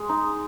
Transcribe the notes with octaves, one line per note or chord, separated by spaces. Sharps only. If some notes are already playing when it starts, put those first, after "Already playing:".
Already playing: G#3 G#4
D#4